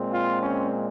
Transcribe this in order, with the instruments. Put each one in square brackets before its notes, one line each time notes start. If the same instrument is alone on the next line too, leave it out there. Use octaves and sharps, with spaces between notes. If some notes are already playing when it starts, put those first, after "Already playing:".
Already playing: [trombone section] A#2 G#3 C4
F4
C#4